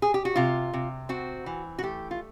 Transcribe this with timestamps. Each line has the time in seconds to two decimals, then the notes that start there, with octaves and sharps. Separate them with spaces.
0.02 G#4
0.14 G4
0.25 F#4
0.36 C3 F4
0.73 C3
1.09 C4 F#4
1.46 E3
1.78 F#4
1.83 A3 G4
2.11 F4